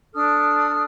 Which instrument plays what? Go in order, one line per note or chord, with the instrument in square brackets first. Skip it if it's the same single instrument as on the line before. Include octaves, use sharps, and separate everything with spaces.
[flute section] D4 A4 D#6 F6